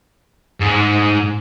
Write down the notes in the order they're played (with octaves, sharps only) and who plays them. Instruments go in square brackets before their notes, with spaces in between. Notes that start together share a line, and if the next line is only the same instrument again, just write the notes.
[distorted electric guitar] G#2